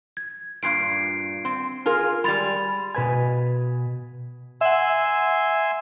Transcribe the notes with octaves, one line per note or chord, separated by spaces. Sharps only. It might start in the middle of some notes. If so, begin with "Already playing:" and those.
G#6
G2 A#2 G#6 C7 D7
C4
F4 G#4 A#4
G3 G#3 B5 A6 F7
B2 B4 G#5
E5 F#5 G#5 C6 E6